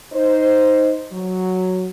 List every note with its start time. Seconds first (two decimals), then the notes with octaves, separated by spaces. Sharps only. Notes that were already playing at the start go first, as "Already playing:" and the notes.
0.13 D#4 C5
1.11 F#3